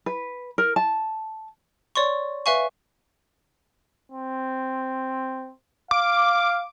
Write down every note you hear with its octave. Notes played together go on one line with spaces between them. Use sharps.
B4
A#4
A5
C#5 D5 C6 C#6
B4 E5 F5 G#5 C#6
C4
F5 D6